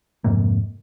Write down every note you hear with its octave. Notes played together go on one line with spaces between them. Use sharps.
F2 G#2 C3 A#3